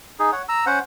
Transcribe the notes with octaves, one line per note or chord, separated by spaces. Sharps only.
D#4 G#4
C#5 F#5
A#5 E6
C#4 C5 F#5